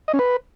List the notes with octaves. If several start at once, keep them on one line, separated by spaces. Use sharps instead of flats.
D#5
C#4
B4